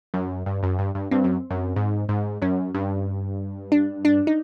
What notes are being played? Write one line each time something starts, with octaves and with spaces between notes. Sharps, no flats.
F#2
G2
F#2
G2
G2
G2 C4
F#2
F#2
G#2
G#2
F#2 C#4
G2
D4
D4
D#4